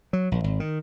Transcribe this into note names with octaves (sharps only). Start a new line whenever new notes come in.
F#3
A#1
G#1
D#3